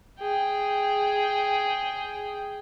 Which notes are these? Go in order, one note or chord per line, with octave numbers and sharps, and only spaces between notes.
G#4 G5